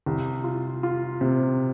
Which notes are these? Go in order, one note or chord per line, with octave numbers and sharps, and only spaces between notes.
C2
F4
F4
C3